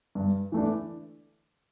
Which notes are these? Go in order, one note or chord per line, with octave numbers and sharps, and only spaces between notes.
G2
E3 A3 D4